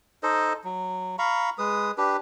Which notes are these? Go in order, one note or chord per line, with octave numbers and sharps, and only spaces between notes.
D#4 A4 C5 D#5
F#3
F5 A#5 B5 C#6
G#3 B4 D#6
D4 G4 B4